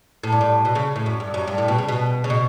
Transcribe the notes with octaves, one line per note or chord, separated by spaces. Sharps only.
A2
G2
A2
B2
C#3
A2
F#2
G2
F#2
G2
A2
B2
C#3
B2
C#3
B2